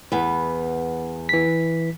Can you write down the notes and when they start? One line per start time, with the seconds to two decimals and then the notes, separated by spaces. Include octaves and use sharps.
0.12 E2 B3
1.29 E3 B6